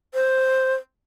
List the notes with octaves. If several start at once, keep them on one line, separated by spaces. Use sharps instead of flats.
C5